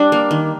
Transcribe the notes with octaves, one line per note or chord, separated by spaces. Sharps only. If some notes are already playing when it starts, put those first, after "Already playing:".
Already playing: G3 D4
A#3
D#3